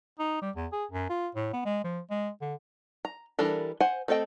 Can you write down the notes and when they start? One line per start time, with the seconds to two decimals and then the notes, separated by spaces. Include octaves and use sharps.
0.19 D#4
0.42 G3
0.56 E2
0.72 G#4
0.91 F#2
1.10 F4
1.35 A2
1.53 B3
1.65 G#3
1.84 F3
2.10 G#3
2.41 D3
3.05 A#5
3.39 E3 G3 D4 A4 A#4
3.80 C5 F#5 G#5
4.08 A3 C4 A4 D#5 G5